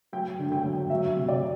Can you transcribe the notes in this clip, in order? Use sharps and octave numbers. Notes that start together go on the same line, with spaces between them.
F#3 G5
D3
G5
F#3
F#3 E5
C3
D5